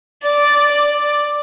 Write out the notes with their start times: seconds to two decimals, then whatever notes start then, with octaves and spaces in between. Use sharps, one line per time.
0.23 D5
0.71 D5